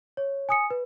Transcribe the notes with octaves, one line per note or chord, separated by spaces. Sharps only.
C#5
G#5 D#6 C#7
B4